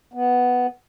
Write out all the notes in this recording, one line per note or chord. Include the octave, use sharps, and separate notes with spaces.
B3